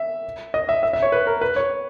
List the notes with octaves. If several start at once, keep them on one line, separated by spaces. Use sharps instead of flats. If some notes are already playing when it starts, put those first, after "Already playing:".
Already playing: E5
D#5
E5
E5
E5
C#5
B4
A#4
B4
C#5